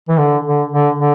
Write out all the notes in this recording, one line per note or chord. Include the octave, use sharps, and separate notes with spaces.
E3
D3
D3
D3
D3